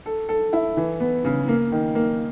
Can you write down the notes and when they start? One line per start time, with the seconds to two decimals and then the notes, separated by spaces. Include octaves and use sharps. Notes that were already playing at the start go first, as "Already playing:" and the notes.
0.06 A4
0.29 A4
0.53 E4
0.77 E3
1.00 B3
1.25 C#3
1.48 A#3
1.72 D#3
1.95 A#3